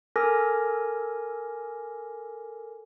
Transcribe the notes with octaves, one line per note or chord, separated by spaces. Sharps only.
A4 A#4 G#5 D6 F6 A#6